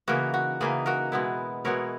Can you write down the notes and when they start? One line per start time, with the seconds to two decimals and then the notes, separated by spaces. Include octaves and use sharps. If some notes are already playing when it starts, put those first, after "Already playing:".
0.08 C#3 E3 A#3 D#4 F#4 A#4
0.34 F#4
0.61 C#3 E3 A#3 D#4 G#4
0.86 F#4 A#4
1.12 B2 G#3 B3 E4
1.64 B2 G#3 B3 E4 A#4 C#5